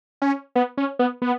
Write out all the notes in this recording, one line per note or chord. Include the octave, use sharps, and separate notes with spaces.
C#4
B3
C#4
B3
B3